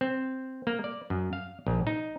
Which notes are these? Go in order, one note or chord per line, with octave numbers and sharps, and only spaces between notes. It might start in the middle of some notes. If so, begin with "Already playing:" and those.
C4
A#3
D5
F#2
F5
A#1
D#4